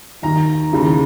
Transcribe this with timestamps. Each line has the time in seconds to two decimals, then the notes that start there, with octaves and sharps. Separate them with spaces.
0.22 D#2 D#3 A#5
0.71 D#2 C#3 E3